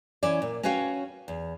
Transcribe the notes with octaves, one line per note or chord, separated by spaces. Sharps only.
E3 C#4 E4 C#5 D5
A#2
C#4 F#4 B4 C#5 F5 G5
E2